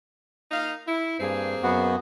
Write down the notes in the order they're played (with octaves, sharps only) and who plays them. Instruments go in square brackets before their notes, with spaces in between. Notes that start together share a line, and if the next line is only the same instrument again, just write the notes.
[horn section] A#3 D#4 F5
E4
[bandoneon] G2 [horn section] A#3 C4 G#4
[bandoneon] F#2 B3 F#4